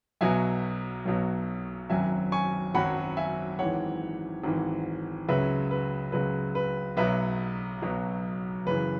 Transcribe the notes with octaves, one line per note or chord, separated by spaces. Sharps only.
B1 B2 F#3 E5 G#5
B1 B2 F#3
G#1 F#2 F#3 E5 G#5
G#5 C#6
G#1 F#2 F#3 F#5 B5
E5 G#5
G#1 G#2 E3 C#5 F#5
G#1 G#2 E3
C#2 C#3 F#3 B4 E5
B4
C#2 C#3 F#3 B4
B4
B1 B2 F#3 B4 E5
B1 B2 F#3
F#1 F#2 C#3 E3 B4